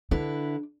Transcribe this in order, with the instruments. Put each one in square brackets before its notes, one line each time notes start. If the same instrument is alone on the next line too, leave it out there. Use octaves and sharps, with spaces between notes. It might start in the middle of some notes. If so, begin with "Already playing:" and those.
[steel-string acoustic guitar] D3 E4 B4 [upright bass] D4